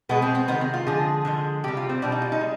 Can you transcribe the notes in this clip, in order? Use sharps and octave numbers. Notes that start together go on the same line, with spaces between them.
B2 G#3 B3
C4
C4
C3 D#3 G#3 B3
C4
F4
D3 F3 G#3 G#4
D3 F3 G#3
C3 G3 G4
F4
C4
B2 G3 D4
D#4
F4
D#4
G#3